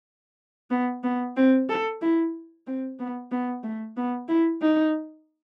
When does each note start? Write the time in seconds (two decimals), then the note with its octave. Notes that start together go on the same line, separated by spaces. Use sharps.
0.70 B3
1.03 B3
1.37 C4
1.69 A4
2.02 E4
2.67 C4
2.99 B3
3.32 B3
3.64 A3
3.97 B3
4.29 E4
4.62 D#4